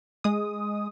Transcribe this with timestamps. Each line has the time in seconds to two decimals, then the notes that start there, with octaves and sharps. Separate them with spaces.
0.24 G#3 D#6